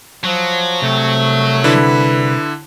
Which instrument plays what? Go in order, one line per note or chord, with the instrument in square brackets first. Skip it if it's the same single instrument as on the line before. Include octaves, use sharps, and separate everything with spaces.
[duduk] F3 [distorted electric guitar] F#3
[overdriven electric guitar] C2 [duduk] A3
[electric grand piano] D3 E4 [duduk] B4